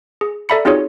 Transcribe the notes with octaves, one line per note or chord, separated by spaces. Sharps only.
G#4
A4 D5 E5 A#5 B5 C#7
C4 D#4 F4 F#4 G#4 C#5